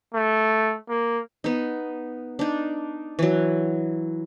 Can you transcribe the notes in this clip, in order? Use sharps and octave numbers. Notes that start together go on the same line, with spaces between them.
A3
A#3
B3 D#4
D4 D#4
E3 F#3